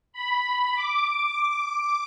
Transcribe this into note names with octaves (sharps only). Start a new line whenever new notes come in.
B5
B5
D6
D6